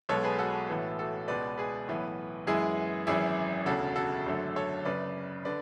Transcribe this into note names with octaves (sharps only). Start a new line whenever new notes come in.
B1 B2 G#3 B3 A4 C#5
G#4 B4
F#4 A4
A1 A2 E3 B3
F#4 A4
C#2 B2 G#3 B4 D5
G#4 B4
B1 A2 E3 B3
F#2 E3 G#3 B3 E4 G#4
G#1 F#2 E3 E4 G#4
E1 D2 C#3 F#4 A4
F#4 A4
G#1 F#2 D3 A3
A4 C#5
F#1 F#2 C#3 B4 D5
D3 B4 D5